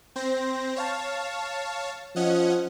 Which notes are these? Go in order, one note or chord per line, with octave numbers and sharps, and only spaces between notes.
C4 C5 A#6
C#5 F5 A5
F3 C#4 D#5 F#5